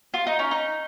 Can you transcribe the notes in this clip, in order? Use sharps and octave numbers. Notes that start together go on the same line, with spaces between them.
F4
D#4
C#4
D#4